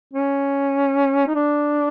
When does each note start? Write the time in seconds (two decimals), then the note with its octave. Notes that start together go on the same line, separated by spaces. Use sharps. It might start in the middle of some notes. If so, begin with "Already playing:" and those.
0.14 C#4
1.27 D#4
1.35 D4